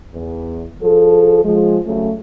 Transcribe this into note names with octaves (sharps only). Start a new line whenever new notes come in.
E2
F3 G#4 A4
F3 G#3
C#3 F#3 A3